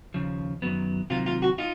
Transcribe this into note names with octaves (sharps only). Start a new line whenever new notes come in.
D#2 C#3 F3
F#2 D#3 F#3 B3
C3 D#3 F#3 A#3 F4
F4
F#4
D#4 F4